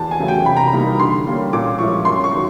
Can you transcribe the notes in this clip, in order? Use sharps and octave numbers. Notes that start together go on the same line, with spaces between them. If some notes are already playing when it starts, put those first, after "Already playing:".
Already playing: E2 A5
G#5
C#3 F#3 A3
G5
C3 B5
A#5
B5
E3 G3 A#3 D#4
D3 C6
G3 A#3 C#4
A#2 D6
F3 G#3 C#4 E4 C#6
F#2 C6
C#6
D#3 F#3